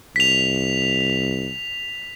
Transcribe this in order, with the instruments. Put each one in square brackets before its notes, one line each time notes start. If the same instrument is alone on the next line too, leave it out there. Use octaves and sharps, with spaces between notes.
[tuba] C2 [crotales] B6 F7